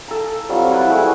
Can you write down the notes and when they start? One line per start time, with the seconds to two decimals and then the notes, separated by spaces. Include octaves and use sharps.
0.08 A4 A#5
0.49 F#3 G3 C4 F4
0.71 E4 B4 F#5
0.89 G3 A3 F#4 G#4